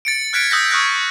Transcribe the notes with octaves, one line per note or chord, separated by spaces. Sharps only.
A6 C#7 D7
F6 F#6 G#6 B6 C#7 D7
D#6 E6 F#6 G6 A#6 B6
C#6 D#6 F6 F#6 G#6 A#6